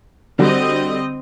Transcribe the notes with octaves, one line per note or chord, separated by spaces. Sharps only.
D3 G3 C4 F#4 D#5